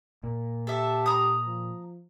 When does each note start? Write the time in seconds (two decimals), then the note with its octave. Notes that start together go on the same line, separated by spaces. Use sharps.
0.23 A#2 A#3
0.67 G4 A4 E5
1.06 A#5 D#6
1.46 F3